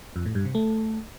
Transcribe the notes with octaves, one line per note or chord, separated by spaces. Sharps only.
F2
A2
G2
C3
A3